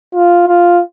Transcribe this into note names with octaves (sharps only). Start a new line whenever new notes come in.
F4
F4